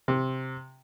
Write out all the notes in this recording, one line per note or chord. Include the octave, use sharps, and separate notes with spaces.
C3